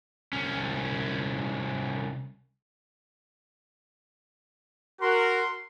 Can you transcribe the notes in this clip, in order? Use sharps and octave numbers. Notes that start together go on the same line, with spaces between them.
C2 C#4
F#4 A#4 C6